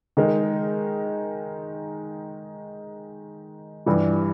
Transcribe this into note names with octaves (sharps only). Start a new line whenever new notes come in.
D#3 G#3 D#4 A#4
G2 E3 G3